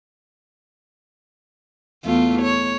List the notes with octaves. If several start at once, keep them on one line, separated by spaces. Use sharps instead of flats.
E2 A3 F4
C#5